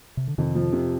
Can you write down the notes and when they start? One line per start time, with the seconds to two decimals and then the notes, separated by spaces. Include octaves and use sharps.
0.17 C3
0.28 D3
0.38 F2 C3 D#3
0.55 F3
0.73 C3